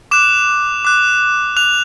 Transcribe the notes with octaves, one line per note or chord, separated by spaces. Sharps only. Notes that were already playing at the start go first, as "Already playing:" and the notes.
D6 F#6 E7
D6 F#6
D6 F#6 F7